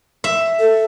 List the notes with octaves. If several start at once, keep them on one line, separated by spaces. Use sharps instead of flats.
E5
A4